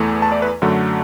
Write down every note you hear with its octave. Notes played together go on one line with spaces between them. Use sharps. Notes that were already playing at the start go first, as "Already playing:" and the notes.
Already playing: E2 E3 A3
A5
D5
B4
F#2 D3 F#3 A3